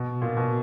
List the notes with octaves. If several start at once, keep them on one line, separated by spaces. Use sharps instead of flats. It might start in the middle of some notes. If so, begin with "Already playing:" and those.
Already playing: B2
A#2
B2